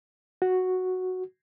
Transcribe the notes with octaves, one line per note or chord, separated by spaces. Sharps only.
F#4